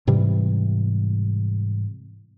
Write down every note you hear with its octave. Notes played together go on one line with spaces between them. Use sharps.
G#2 C3 E3 G3